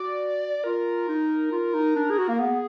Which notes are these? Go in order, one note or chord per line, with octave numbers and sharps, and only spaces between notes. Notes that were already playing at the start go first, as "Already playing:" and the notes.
Already playing: F#4 D5
F4 A#4
D#4
F4
D#4
D4
G#4
F#4
A#3
B3 G#4